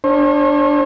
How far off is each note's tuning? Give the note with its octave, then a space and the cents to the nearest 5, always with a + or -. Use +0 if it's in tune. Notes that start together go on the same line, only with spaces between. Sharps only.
D4 +0 C#5 -45